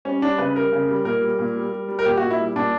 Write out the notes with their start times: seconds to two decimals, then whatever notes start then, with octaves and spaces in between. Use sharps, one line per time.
0.05 G3 C#4
0.21 G3 D4
0.38 C#3 B4
0.56 G3 A#4
0.72 C#3
0.88 G3
1.05 A#2 A#4
1.21 G3
1.39 A#2
1.56 G3
1.72 G3
1.88 G3
1.99 A#4
2.05 A#2 G4
2.17 A#2 F#4
2.31 E4
2.39 G3
2.56 A#2 D4